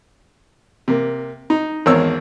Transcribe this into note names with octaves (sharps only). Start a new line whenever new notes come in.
C3 A#3
D#4
G#1 E2 C4 A#4 C#5 E6